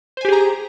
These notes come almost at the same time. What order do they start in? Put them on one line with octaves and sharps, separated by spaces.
C5 G#5 G4 G#4 A#5